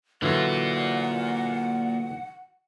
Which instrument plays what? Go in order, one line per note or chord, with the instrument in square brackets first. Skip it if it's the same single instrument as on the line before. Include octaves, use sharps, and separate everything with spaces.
[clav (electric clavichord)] D3 E3 F#3 [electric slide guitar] A#3 F4 [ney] F#5